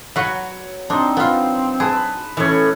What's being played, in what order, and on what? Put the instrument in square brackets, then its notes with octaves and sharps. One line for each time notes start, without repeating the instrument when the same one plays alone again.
[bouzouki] F#3 [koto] F#4 B4
[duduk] C4 [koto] D4 [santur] D#4 C5
[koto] B3 F4
[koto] G#4 [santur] B4 A5
[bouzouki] A2 E4 [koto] E3 [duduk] C#4 [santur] B4 C#5